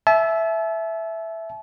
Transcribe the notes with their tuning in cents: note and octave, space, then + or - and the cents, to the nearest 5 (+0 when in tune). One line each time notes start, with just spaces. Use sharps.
E5 +0 A5 -40